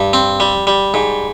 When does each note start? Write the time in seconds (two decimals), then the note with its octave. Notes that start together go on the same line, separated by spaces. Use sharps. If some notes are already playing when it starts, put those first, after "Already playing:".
Already playing: G2
0.13 C4
0.40 G3
0.67 G3
0.94 G#2